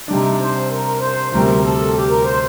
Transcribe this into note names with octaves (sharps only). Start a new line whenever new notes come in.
C3 G3 D4 D#4
C5
A#4
C5
D2 C3 G3 C4 A#4
A4
G4
A#4
C5